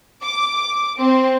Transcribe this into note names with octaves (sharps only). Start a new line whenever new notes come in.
D6
C4